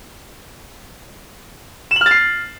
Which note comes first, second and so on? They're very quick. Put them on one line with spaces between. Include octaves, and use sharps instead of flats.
E7 F#7 F6 A6 C7